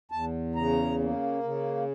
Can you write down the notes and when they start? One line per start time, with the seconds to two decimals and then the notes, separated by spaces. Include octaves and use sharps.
0.12 E2 A5
0.55 C#3 A#5
0.99 A#3
1.43 C#3